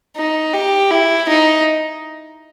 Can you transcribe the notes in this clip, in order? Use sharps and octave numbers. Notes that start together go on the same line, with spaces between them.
D#4
G4
E4
D#4